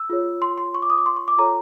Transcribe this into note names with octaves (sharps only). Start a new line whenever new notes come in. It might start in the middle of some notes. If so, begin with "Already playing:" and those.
Already playing: E6
F4 G#4 C#5
C6
C6
C#6
D6
D#6
D6
C6
C#6
D6
F4 A4 C#5 A#5